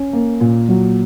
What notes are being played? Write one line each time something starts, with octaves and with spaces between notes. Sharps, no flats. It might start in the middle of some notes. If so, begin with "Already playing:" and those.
Already playing: C#4
A#3
A#2
F#3